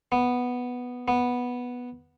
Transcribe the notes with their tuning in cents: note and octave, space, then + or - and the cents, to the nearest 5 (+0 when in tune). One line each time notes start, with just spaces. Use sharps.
B3 +0
B3 -5